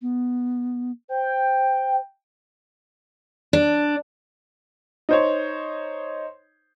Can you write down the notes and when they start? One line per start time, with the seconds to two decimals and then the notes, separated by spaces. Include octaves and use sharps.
0.02 B3
1.09 C5 G5
3.53 D4
5.09 D#4 C5 C#5